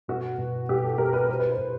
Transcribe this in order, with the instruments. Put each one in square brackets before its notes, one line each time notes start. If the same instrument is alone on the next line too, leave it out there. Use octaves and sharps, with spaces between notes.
[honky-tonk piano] B2 F#4
B2
B2 G4
A4
B2 A#4
B4
B2 C5
B4
C5
B2